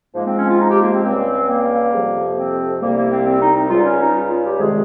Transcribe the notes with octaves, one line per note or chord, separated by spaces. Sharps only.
G#2 F3 G#3 A#3
C4
C#4
F4
D#4
G4
A#3
C4
C#2 C#3 G3 C4
A#3
F2 C3 F3
C4
C2 C3 G3 A#3
A#3
C4
C4
D#4
D#4
C#2 C#3 G3 F4
C#4
D#4
F4
G4
F2 C3 D#3 G#3 G#4